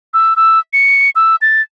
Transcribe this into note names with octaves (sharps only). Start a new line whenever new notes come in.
E6
E6
C#7
E6
A6